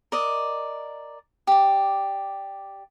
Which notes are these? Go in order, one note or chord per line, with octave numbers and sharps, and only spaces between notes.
A#4 D5 D#5
G4 D5